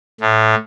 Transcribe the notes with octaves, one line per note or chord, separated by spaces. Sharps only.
A2